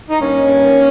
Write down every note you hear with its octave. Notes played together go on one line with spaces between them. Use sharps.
D#4
G2 A#3 C#4
G2
D#3